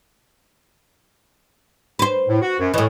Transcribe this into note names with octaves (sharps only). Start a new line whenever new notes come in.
B4 C5
A2
F#4
F#2
A2 E3 C#5 D#5